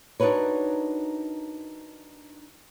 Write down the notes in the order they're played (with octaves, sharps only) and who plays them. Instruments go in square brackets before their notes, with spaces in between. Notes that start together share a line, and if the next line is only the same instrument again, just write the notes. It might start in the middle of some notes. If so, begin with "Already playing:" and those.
[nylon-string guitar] D4 D#4 F#4 A#4 B4 C#5